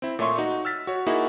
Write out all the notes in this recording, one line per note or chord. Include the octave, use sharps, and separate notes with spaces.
C4 E4
A#2 A3 C#5 E5 C6 C#6
D#4 F#4
E6 F6 A6 B6
F#4 C#5
A#3 D#4 E4 F#4 G#4